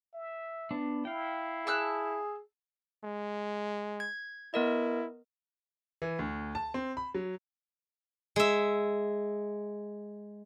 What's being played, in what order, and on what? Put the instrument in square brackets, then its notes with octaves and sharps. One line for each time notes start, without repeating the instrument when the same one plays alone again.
[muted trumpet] E5
[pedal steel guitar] B3 D4
[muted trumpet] E4 [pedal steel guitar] F5 G5
[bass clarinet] G#4 [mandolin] A5 E6 F#6
[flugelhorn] G#3
[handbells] G#6
[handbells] B3 A#4 D#5 [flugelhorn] E4
[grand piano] E3
D2
A5
C4
B5
F#3
[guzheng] G#3 E5